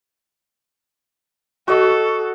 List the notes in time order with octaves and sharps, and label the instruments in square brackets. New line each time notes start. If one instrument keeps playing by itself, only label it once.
[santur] F#4 C#5 D#5 [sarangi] A4